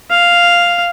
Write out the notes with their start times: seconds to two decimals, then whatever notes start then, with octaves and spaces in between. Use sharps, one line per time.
0.11 F5